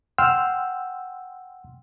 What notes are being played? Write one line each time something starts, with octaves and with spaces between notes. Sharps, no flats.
F#5 G5 C6 E6 F6